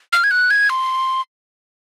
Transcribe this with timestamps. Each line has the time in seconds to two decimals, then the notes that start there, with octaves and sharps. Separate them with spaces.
0.13 F6
0.24 G#6
0.31 F#6
0.51 G#6
0.70 C6